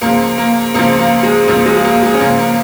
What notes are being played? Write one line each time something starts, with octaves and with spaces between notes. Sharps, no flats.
C#2 C#3 F3 A#3
A#3
C#2 C#3 F3 A#3
A#3
G#3
C#2 C#3 F3 A#3
G#3
G#3
A#3
G#3
C#4
C#2 C#3 F3 A#3
A#3